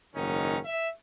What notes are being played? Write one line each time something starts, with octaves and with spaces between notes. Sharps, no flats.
F#1 G#2 D#3 C#4 D#4
E5